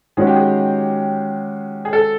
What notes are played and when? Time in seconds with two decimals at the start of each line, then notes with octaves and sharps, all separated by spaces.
0.17 D#3 G#3 C#4 F#4 G#4
0.27 G4
0.36 G#4
1.85 G#4
1.93 A4